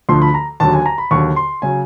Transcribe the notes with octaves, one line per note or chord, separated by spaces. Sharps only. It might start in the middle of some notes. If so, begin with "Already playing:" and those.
D2 D3 F3 C6
B5
A#5
D#2 D3 F#3 A5
G#5
A#5
B5
D#2 D3 F#3 C#6
C6
C#3 F#3 G#5